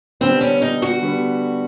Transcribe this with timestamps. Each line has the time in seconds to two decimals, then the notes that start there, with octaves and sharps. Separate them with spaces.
0.21 D3 G3 B3 C4
0.41 C#4
0.62 D#4
0.82 F#4
1.02 D3 G3 B3